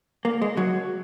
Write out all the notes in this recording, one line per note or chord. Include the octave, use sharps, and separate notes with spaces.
A#3
G#3
F#3